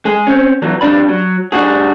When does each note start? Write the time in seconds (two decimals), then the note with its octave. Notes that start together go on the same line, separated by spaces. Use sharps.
0.05 G#3 G#4
0.27 C4 C#4
0.62 B1 E2 E3 F#3
0.81 F2 G3 D4 D5 B5
1.09 F#3
1.52 G3 D4 D#4 F#4 G#4